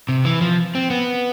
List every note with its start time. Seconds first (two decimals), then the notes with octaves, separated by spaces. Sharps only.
0.09 C3
0.25 E3
0.41 F3
0.75 C4
0.90 B3